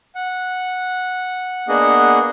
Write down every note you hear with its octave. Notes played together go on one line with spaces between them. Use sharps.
F#5
A#3 B3 D4 G#4 D#5 F#5